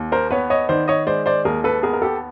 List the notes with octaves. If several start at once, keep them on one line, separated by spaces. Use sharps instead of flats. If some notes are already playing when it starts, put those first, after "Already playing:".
Already playing: D#2
A#4 C5
B3 B4 C#5
C#5 D#5
D#3 C5 D5
C#5 D#5
G#3 C5 D5
C5 D5
D#2 G#4 A#4
A4 B4
B3 G#4 A#4
A#4
G4 A4